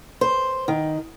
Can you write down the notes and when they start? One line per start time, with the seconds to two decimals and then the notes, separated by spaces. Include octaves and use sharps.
0.21 C5
0.68 D#3